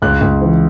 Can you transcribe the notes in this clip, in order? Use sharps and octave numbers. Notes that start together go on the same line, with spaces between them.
C#2 F#6
C#2
E3